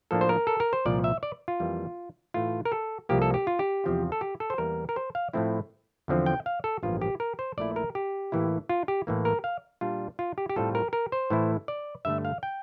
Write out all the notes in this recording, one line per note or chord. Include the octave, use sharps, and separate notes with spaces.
A2 F3 A#3 D4 A4
C5
A#4
A4
A#4
C5
C2 A#2 F3 D5
E5
D5
F4
F2 E3 G3 A#3
A2 E3 A3 F4
A#4
A4
C2 C3 F3 A#3 G4
A4
G4
F4
G4
E2 C3 F3 C4 F4
A4
G4
A4
C5
E2 E3 G3 A#3 A#4
A#4
C5
F5
A2 F3 A3 C4 E4
E2 D3 F3 C4
G5
F5
A4
A1 G2 F3 A#3 F4
G4
A#4
C5
A#1 A#2 A3 E4 D5
A#4
G4
A2 E3 A#3 E4
F4
G4
A2 E3 A#3
A#4
F5
A#2 G3 D4 F4
F4
G4
G4
A2 G3 C4 F4 A4
A#4
A#4
C5
A2 E3 A3 E4
D5
G2 D3 A3 E5
F5
G5